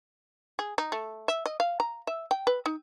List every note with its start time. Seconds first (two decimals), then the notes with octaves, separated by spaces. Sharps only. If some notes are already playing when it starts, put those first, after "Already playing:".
0.59 G#4
0.78 D#4
0.92 A3
1.28 E5
1.46 D#5
1.60 F5
1.80 A#5
2.07 E5
2.31 G5
2.47 B4
2.66 D#4